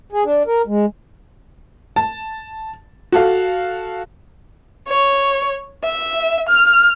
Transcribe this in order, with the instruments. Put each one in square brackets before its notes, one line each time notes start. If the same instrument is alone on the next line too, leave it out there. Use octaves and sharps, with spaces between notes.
[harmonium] G#4
D4
A#4
G#3
[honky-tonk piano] A5
F#4 A4 F5
[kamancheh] C#5
E5
F6